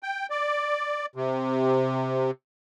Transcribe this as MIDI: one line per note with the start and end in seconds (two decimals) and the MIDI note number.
0.03 0.27 79
0.30 1.06 74
1.15 2.31 48